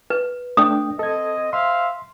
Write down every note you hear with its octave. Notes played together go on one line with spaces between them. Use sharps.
B4
A3 D4 G5 D#6
C4 A4 D#5 G#6
C5 E5 F5 C6